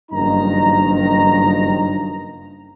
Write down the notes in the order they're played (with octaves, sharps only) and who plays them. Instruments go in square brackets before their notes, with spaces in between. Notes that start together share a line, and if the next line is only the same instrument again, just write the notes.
[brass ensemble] F#1 G2 D#3 F3 D#4 A#5